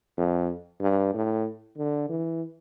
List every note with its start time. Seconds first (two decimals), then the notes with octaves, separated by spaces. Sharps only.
0.17 F2
0.81 G2
1.14 A2
1.77 D3
2.09 E3